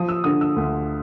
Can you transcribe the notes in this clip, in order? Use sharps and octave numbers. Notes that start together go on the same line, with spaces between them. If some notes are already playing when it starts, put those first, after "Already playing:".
Already playing: F3 D#6
E6
D3 D#6
E6
D2